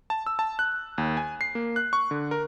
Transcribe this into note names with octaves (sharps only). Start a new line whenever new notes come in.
A5
E6
A5
F#6
D#2
G#5
C7
A#3
F#6
C#6
D3
A#4